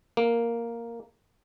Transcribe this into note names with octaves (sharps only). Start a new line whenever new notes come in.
A#3